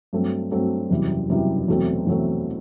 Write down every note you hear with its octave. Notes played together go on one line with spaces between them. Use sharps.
G2 F#3 A3 C4
G2 F#3 A3 C4
F#1 E2 C3 E3 G3
F#1 E2 C3 E3 G3
E2 B2 F#3 A3 C4
E2 B2 F#3 A3 C4